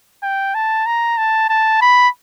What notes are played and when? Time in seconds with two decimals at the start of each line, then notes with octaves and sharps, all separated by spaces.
0.23 G5
0.54 A5
0.86 A#5
1.18 A5
1.49 A5
1.81 B5